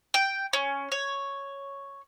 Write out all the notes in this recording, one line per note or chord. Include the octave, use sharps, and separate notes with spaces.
G5
C#4
C#5